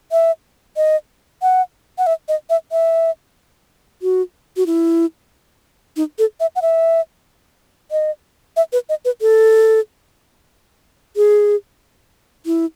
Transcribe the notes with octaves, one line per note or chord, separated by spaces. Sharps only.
E5
D#5
F#5
F#5
E5
D#5
E5
E5
F#4
F#4
E4
D#4
A4
E5
F#5
E5
D#5
E5
B4
D#5
B4
A4
G#4
E4